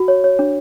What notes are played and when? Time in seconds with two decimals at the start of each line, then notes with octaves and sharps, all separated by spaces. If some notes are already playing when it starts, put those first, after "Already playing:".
Already playing: F#4
0.08 C#5
0.24 C#5
0.39 D4